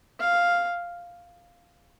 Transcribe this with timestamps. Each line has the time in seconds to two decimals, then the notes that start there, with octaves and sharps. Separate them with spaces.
0.20 F5